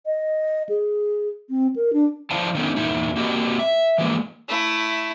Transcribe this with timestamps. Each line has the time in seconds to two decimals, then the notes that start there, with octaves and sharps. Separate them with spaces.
0.06 D#5
0.69 G#4
1.50 C4
1.76 A#4
1.93 D4
2.31 F3 E4 C5 D5 F5 A5
2.55 D3 D#3 A3 B3 C#4 D#4
2.76 E2 A#2 D#4 E4
3.16 A#3 C4 F#4 G4 D#5
3.59 E5
3.98 E3 F3 G#3 A#3
4.49 A3 E4